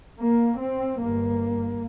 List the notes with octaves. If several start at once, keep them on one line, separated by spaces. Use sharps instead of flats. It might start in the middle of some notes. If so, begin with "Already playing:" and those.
A#3
C4
G1 G2 A#3